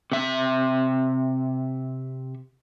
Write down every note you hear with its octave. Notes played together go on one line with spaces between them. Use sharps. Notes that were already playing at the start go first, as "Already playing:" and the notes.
C3 E5